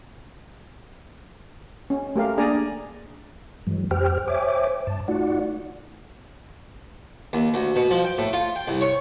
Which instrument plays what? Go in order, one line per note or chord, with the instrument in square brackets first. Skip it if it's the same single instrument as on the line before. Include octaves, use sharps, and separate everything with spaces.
[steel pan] C#4
A3 G4 A#4 F5
A#3 D4 G#4 D5 G#5 A#5
[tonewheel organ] G2 E3 F#3 G#3
F2 G4 C5 G5 F6
C5 C#5 E5 G5 G#5 D6
G2 A5
A3 D#4 F4 F#4 D5 F#5
[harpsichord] D#2
D2
B2
F3
G5
A2
F4
G5
C2
C#5